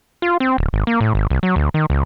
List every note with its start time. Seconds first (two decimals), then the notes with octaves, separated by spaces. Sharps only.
0.22 F4
0.40 C4
0.58 D1
0.73 G#1
0.87 A#3
1.01 A2
1.15 G#1
1.30 C2
1.43 F#3
1.56 D2
1.74 D#3
1.90 C#2